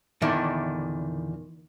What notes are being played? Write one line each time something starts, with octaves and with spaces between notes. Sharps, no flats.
E2 A#2 D3 D#3 E4